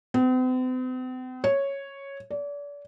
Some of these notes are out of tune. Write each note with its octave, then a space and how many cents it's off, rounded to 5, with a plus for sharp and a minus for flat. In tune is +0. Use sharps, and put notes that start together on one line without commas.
C4 -45
C#5 -5
D5 -35